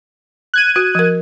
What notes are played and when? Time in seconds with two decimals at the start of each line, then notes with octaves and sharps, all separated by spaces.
0.54 F#6 G#6 D#7
0.76 F#4
0.95 F3 A#4